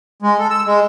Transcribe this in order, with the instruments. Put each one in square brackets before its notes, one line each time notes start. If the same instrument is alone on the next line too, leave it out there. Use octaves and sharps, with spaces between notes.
[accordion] G#3
A4
E6
G#3